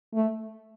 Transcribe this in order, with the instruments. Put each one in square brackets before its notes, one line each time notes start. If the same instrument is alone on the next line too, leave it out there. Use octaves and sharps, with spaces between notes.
[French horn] A3